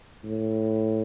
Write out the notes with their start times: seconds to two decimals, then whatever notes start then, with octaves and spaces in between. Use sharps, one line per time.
0.25 A2